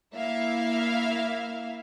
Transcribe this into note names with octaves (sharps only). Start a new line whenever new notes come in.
A#3 E4 E5 F5